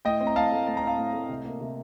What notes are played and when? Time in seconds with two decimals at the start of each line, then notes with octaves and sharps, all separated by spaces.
0.05 A2 D#5 G5
0.21 C4
0.27 A#5
0.36 A2 F5 A5
0.52 A3
0.67 A2 A5
0.77 A#5
0.83 C4 F5 A5
0.98 A2
1.13 A3
1.29 C3
1.44 A#3
1.61 C3